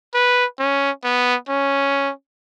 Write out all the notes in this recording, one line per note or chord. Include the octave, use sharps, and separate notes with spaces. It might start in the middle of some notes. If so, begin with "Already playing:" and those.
B4
C#4
B3
C#4